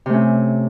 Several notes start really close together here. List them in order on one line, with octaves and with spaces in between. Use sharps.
C3 A3 C#4